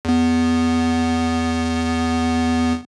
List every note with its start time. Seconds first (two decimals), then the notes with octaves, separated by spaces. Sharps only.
0.05 E2 B3